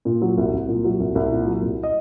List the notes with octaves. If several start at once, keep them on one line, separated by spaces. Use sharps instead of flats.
A#2
F#3
C2
C2
A#2
F#3
C2
C2
A#2
F#3
C2
D#5